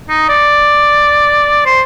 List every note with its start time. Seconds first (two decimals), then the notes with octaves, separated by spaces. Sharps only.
0.09 D#4
0.29 D5
1.66 C5